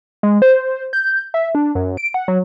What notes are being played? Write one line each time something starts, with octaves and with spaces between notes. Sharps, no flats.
G#3
C5
G6
E5
D4
F#2
D7
F#5
F#3